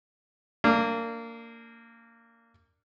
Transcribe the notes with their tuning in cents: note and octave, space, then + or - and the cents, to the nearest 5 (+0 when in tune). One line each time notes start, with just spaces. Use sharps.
A#3 -20 D4 +0